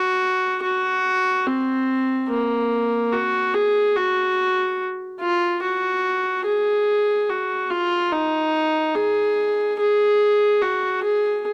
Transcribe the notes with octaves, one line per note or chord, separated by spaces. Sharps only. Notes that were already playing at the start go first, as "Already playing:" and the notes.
Already playing: F#4
F#4
C4
A#3
F#4
G#4
F#4
F4
F#4
G#4
F#4
F4
D#4
G#4
G#4
F#4
G#4